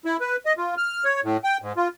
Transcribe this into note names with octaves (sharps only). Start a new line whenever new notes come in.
E4
B4
D#5
F4
F6
C#5
A2
G5
G#2
F4